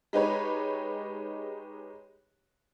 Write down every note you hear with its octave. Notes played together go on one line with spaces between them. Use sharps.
G#3 D#4 G4 B4 C#5